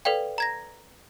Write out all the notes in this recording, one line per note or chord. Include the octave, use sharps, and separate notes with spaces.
A4 B4 D5 F5 G5
A#5 G#6 A#6